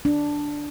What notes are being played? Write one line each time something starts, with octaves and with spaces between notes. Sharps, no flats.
D4